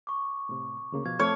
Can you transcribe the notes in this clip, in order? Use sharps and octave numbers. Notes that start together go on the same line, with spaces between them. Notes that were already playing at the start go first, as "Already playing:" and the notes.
C#6 D6
A2 C3
D2 C#3 A#3
B2 F3 F5 G#6
F2 A3 C4 C#5 A5 D6 F6